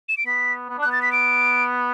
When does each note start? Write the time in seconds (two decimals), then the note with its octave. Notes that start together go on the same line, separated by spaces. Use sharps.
0.09 E7
0.17 D7
0.26 B3 B6
0.69 B3
0.78 D4
0.82 B3 F#6
0.92 A6
1.02 B6
1.12 D7